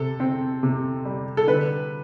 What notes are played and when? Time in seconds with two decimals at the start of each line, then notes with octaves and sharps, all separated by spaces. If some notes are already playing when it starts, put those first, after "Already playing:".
Already playing: C3 A4
0.20 C4
0.63 C3
1.05 G3
1.37 A4
1.47 D3 B4